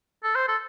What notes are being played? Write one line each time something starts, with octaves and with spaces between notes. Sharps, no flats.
A4
C5
A4